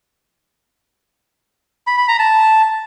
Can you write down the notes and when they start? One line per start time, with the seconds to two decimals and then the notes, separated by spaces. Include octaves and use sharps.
1.87 B5
1.98 B5
2.08 A#5
2.19 A5